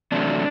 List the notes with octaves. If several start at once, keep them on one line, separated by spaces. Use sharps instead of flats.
E2 C3 F#3 A3 D4